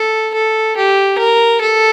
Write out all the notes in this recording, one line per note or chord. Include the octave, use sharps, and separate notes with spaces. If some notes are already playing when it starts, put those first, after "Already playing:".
Already playing: A4
A4
G4
A#4
A4